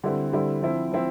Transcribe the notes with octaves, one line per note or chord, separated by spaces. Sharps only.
D3 G3 C4 E4
D3 G3 C4 E4
F3 C4 E4
F3 C4 E4